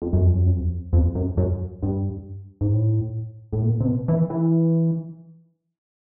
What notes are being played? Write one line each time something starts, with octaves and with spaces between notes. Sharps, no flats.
F2
F#2
F2
F#2
F2
F2
F#2
F#2
G2
G#2
A2
A2
A#2
C3
B2
E3
E3